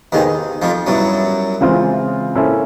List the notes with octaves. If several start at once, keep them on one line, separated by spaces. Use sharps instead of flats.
D#2 D#3 B3 D#4 G#4 C5
F2 F3
F#2 F#3 G3 B3 E4
C#3 E3 G#3 C4 F4
A#3 C#4 E4 A4 C5